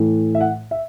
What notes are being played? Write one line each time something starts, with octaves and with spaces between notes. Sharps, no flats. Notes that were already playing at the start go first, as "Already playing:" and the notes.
Already playing: A2 E3 A3
E5
F#5
E5